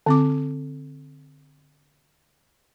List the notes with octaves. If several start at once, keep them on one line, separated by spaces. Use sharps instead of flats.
D3 C4 D6